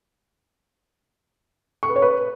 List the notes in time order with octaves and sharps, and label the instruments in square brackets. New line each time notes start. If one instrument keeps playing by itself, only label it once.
[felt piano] C#6
B4
C#5
B4